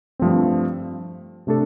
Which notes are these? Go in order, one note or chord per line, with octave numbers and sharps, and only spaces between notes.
G2 F3 A3 C4
C3 A3 D4 A4